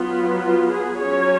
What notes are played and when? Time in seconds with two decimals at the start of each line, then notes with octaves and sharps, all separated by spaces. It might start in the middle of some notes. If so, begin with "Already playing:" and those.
Already playing: F#3 B3 F4
0.42 F4
0.70 G#4
0.99 F#3 C#4 C#5